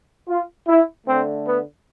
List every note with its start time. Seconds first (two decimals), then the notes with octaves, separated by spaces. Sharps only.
0.28 F4
0.68 E4
1.06 D3 A3 C4
1.45 B3